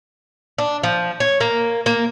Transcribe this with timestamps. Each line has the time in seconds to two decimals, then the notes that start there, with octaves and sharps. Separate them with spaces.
0.58 D4
0.83 F3
1.20 C#5
1.41 A#3
1.86 A#3